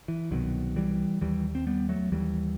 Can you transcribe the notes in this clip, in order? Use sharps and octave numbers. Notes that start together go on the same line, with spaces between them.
E3
C2 B2 D#3 F#3
E3 G3
D#2 E3 G3
C4
G3 B3
F#3 A3
D#2 E3 G3